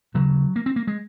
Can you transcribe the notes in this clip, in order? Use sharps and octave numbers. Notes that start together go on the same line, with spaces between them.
D#2 C#3 F#3
A#3
C4
A#3
G#3